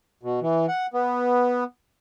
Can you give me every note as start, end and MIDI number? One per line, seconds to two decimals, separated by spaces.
0.23 0.40 47
0.42 0.66 52
0.68 0.86 78
0.94 1.64 59